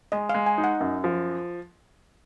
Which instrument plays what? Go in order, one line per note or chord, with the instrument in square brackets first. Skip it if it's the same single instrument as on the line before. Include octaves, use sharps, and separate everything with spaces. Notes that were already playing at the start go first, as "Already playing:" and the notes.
[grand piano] G#3 [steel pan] D#5
[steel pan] F5
[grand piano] G#3
[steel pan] G#5
[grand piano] D#4
[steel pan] F#5
[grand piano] F#2
F3